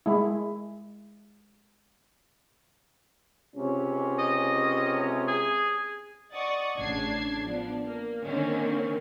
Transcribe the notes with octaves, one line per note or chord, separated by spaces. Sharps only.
G#3 E4
C#2 C3 C#4
D#5
G#4
D5 D#5 F#5 C#6 D#6 A6
A1 C#3 D4 A5 G#6 C7
F3 B3 D4
A#3
D3 D#3 A#3 C4 C#4